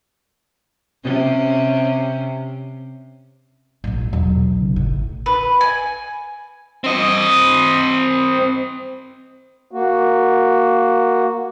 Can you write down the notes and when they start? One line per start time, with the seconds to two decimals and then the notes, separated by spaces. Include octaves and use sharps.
1.04 C3 C#4
3.84 A#1 G2
4.13 B1 E2
4.61 C#3
4.76 G#1 A2
5.26 B4
5.61 G#5
6.84 C4 D#5
9.71 A#3 F#4